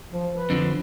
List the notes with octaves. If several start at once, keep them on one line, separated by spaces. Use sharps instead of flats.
F3
B4
F2 D3 F3